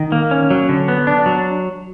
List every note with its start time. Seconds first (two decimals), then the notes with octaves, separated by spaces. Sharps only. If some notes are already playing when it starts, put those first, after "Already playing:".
Already playing: D#3
0.12 A#3
0.31 C#4
0.51 F#3
0.69 D3
0.88 B3
1.07 D4
1.26 F#3